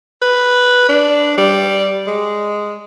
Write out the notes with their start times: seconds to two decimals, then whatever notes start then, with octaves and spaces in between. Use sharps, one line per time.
0.22 B4
0.89 D4
1.38 G3
2.07 G#3